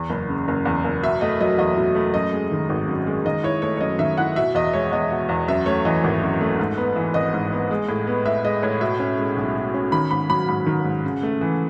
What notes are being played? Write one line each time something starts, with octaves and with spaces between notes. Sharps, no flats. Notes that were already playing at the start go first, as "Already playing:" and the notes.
Already playing: E2
F#1
C#3
F#1
E2
F#1
B2 E5
A3 D#5
F#3 D#5
E2 D#5
B2
A3
F#2 D#5
G#3
D#3
G#1
F#2
G#3
D#3 D#5
E4 C#5
A3 C#5
C#5
F#2 D#5
D#3 E5
E4 F#5
B2 E5
E2 D#5
G#3 C#5
E2 D#5
B2
E2
F#2 E5
A3 C#5
E3 D#5
G#1
F#2
A3
G#2
B3
E3
G#1 D#5
G#2
B3
G#3
A2
B3
A2 E5
G#3 D#5
A2 C#5
B2 E5
C#4
G#3
B1
B2
C#4
D#3 B5
G#2 B5
F#3 B5
G#2 B5
D#3
G#2
C#3
A3
E3